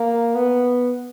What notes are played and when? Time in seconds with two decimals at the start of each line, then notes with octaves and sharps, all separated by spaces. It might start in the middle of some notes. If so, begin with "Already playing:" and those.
Already playing: A#3
0.35 B3